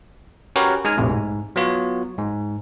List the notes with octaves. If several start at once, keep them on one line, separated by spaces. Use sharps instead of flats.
C#4 F#4 G4 A#4 B4 C#5
G#3 D#4 G#5 F6
A#1 F2 A2 C3
G#2
F#3 B3 F4 C#5
G#2